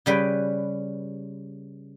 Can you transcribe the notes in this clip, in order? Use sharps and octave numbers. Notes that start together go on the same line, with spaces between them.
C#3 G3 B4